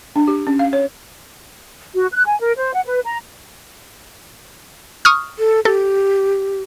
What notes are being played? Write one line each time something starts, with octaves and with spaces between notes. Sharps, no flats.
D4
G4
C#4
F5
C#5
F#4
F#6
G#5
A#4
C5
F#5
B4
A#5
C#6 D#6 F6
A4
G4 A4